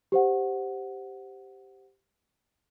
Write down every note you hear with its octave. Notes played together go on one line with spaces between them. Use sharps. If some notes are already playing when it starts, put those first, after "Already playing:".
G4 C5 F#5